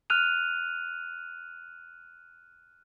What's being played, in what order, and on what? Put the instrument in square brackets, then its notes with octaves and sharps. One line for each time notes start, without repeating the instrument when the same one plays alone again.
[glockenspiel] F6 F#6 D#7 F7